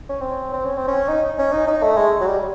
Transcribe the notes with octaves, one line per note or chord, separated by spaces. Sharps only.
C#4
C4
C4
C#4
C4
C#4
D#4
C#4
D#4
D#4
A3
G#3
F#3
G3